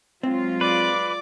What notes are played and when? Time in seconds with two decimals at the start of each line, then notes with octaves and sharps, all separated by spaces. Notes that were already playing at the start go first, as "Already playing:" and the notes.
0.23 F#3 G#3 C4 F4
0.61 B4 D5 D6